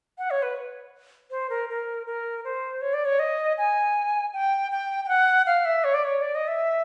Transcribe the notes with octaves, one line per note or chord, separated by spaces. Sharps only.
F#5
C#5
B4
C5
A#4
A#4
A#4
C5
C#5
D5
C#5
D#5
G#5
G5
G5
G5
F#5
F5
E5
C#5
D5
C#5
D5
D#5
E5